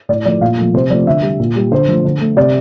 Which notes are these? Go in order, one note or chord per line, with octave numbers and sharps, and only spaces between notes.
A2 D5
F3 A3 D5
A#2 F5
F3 A3
C3 C5
F3 A3 D5
D3 E5
G3
A#2
G3
D3 C5
F3 A3
D3
A3
C3 D5